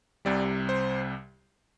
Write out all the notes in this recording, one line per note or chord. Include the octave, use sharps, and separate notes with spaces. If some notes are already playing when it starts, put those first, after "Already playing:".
C2 C3 G3 D5
C5